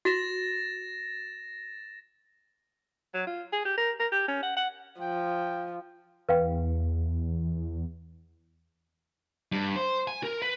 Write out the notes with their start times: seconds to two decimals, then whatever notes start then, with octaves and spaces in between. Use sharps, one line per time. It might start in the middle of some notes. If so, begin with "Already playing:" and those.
0.05 F#4 A6 A#6 E7
3.14 F#3
3.27 F4
3.52 G#4
3.65 G4
3.77 A#4
3.99 A#4
4.12 G4
4.28 C#4
4.43 F#5
4.56 F#5
5.00 F3 G5
6.29 E2 B4 F5 G5
9.52 G2
9.76 C5
10.07 G#5
10.23 A#4
10.42 B4